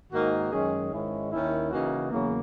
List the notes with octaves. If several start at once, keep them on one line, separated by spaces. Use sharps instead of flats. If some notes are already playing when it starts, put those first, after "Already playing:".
G#2 D#3 A#3 D#4 F#4
F#2 D#3 G#3 C#4 G#4
G#2 D#3 G#3 C#4 E4
D#2 D#3 A#3 C#4 E4
C#3 E3 A#3 D#4 F#4
E2 C#3 F#3 A#3